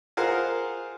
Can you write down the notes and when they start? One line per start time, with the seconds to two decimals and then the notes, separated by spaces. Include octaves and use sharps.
0.17 F4 G#4 A#4 C5 F5 F#5